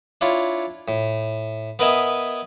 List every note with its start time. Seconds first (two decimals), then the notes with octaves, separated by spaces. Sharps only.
0.21 D4 E4 F4 C#5
0.88 A2
1.79 B3 A#4 B4 D#5 E5 G#5